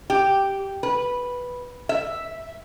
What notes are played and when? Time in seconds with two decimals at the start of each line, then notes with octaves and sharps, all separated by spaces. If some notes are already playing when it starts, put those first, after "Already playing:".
0.10 G4
0.83 B4
1.89 E5